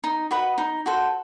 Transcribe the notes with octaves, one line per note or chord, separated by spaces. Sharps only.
D#4
F#4 B4 D#5
D#4
F#4 A4 C5